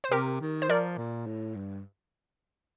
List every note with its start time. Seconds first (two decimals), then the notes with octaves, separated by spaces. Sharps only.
0.04 C5
0.12 C3 G4 A#4
0.41 D#3
0.62 C5
0.69 F3 A#4 D5
0.98 A#2
1.26 A2
1.55 G2